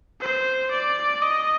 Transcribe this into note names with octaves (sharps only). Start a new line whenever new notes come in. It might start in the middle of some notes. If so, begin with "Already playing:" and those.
C5
D5
D#5